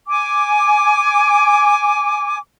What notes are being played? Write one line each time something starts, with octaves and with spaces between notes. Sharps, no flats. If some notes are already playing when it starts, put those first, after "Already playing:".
G#5 D6